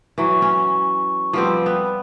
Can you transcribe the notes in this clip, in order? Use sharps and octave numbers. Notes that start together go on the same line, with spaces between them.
E3 F#3 C#6
C#4
F3 G3 C4 B4 F#5
B3